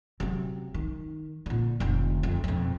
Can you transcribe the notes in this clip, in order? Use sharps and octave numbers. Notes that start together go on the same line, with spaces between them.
C3 F#3
D#3
A#2 D3
F1 D3
F2
F2 B2